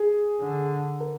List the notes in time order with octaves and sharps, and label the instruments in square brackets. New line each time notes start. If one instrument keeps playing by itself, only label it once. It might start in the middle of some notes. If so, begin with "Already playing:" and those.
Already playing: [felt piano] G#4
[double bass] D3
[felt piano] A#4